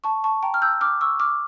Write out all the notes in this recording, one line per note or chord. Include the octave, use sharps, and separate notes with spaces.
A5 C#6
A5 C#6
G5 A#5
F6
E6 G6
D6 F6
C#6 E6
D6 F6